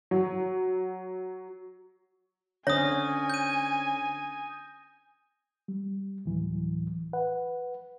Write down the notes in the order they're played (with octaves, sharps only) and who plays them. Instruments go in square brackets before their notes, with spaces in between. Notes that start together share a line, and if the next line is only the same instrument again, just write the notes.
[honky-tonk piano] F#3
[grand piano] D3 C4 C#4 [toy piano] C#5 [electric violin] G#5 [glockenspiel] D#6 A#6
[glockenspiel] G6 D#7
[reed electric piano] G3
D2 A2 E3 F#3
B4 F#5